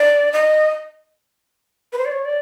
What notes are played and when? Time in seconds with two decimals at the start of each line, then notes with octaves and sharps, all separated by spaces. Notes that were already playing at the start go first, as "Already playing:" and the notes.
Already playing: D5
0.33 D#5
1.93 B4
1.98 C5
2.05 D5
2.11 C#5
2.25 D5